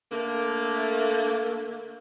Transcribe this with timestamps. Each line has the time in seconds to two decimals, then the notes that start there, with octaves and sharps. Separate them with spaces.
0.12 D3 A3 A#3